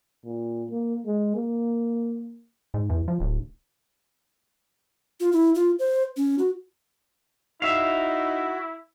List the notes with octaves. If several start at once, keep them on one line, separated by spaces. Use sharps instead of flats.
A#2
A#3
G#3
A#3
G#2
E2
F3
D1
F4
E4
F4
C5
C#4
F#4
D#4 E4 F#4 E5 F5